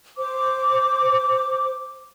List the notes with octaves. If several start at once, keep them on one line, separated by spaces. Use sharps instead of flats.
C5 D6